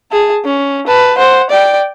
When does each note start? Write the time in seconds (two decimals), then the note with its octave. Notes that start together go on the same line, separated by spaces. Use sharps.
0.12 G#4 A5
0.45 C#4
0.87 B4 A5
1.18 C5 F#5
1.50 D5 G5